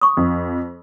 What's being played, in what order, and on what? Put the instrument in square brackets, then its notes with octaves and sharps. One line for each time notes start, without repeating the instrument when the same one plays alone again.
[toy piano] C#6 D#6
[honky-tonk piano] F2